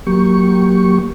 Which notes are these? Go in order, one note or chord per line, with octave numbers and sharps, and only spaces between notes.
F#3 A#3 G4 C#6